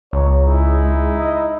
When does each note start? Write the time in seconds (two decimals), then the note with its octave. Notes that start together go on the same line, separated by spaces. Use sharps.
0.13 C#2 C#5 A#5
0.45 D#4 E4 G#4
0.82 G#3
1.18 D#5